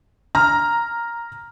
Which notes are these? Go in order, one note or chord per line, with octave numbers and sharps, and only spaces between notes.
A#5 F6